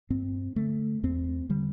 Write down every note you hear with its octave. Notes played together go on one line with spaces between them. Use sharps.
G2 C4
D3 A3
E2 C4
D3 G3